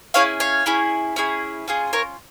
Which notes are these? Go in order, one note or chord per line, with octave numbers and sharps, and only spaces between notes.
C#4 E4 G#4 C#5 F5
C#5 F5
C#4 E4 G#4
C#4 E4 G#4
C#4 F4 G#4
A#4 C#5